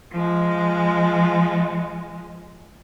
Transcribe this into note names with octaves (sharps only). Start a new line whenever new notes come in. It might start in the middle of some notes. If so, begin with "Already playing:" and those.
F3 G#3